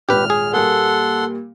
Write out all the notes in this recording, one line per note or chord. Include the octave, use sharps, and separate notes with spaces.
D#1 G#1 G4 B4 F6
G#4
A#2 G3 A#3 A4 F#5 C6